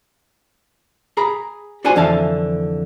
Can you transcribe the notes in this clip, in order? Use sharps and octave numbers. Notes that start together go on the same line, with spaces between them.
G#4 A#5 B5
D4 F#4 G#4 C5 G#5
F2 D3 E3 F5 A5